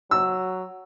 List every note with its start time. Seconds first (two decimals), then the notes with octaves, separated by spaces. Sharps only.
0.11 F#3 E6